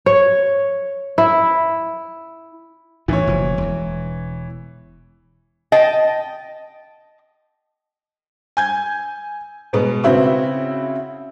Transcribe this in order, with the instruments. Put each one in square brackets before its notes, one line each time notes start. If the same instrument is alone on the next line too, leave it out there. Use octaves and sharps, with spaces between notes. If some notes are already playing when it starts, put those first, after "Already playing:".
[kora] C#5
E4
[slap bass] A1 G2 D#3 [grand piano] E3 C#5
[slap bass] F#1 B2 F3
E1 E2
[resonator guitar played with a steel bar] D#5 G5 A5
[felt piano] G#5 G6 G#6
B2 G#3 B3
C#3 C4 E4 F#4